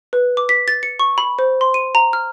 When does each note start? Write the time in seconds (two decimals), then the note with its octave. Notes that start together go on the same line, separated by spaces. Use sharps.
0.13 B4
0.37 D6
0.49 B6
0.68 A6
0.83 C#7
0.99 C#6
1.18 B5
1.39 C5
1.61 C6
1.74 D#7
1.95 A#5
2.13 F6